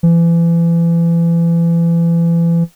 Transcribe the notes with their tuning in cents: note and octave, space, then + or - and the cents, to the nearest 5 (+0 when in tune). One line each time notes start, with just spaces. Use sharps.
E3 +35